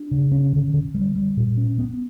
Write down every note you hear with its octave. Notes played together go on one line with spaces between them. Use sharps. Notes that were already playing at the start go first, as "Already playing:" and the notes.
Already playing: D4
C#3
C#4
D3
D3
G3
G3
A#2
C#4
B3